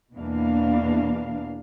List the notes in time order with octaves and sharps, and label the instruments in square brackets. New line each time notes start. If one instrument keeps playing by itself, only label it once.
[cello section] E2 B2 E3 A#3 D4 F5